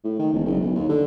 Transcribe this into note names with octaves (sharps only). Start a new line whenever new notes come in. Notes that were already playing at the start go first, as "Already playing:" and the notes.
A2
D#3
E1
F#1
B1
D#2
D3